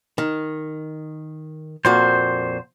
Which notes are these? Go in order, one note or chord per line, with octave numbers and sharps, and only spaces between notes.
D#3
F2 A#2 F#4 C5